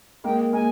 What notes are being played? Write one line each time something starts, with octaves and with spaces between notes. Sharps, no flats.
G#3 A#3 G5
G#3 A#3 G#5